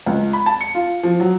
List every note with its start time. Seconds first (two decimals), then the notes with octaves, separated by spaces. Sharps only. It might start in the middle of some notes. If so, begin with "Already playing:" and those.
0.06 C#2
0.33 B5
0.46 A5
0.61 C#7
0.75 F4
1.03 F3
1.20 F#3